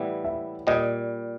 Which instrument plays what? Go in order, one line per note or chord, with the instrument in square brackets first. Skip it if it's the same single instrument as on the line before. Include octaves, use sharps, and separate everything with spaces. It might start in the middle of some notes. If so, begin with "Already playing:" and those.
Already playing: [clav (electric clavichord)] A2 E3 G3 B3 E4
[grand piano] E5
[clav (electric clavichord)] A#2 G3 [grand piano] D#5